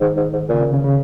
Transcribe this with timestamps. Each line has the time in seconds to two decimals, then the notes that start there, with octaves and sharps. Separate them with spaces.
0.01 G#2 D#3
0.17 G#2
0.33 G#2
0.49 A#2 C#3
0.61 C#3
0.73 C#3
0.84 C#3